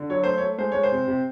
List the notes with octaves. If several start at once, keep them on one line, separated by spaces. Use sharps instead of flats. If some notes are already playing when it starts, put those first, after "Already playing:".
Already playing: D3
F#3 C#5
A3 C5
C#5
A3
G#3 C5
G#3 C#5
C5
C3
C3